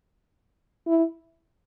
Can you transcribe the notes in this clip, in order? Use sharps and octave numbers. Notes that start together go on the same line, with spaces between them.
E4